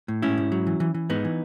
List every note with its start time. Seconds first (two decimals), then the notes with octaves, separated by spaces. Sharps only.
0.08 A2
0.22 G#2 C#4 E4
0.38 G#2
0.52 F#3
0.67 E3
0.80 E3
0.94 E3
1.09 G#2 B3 D#4
1.25 E3